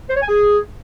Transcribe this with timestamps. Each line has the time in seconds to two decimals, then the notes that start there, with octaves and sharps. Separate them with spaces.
0.09 C5
0.15 C#5
0.22 G#5
0.29 G#4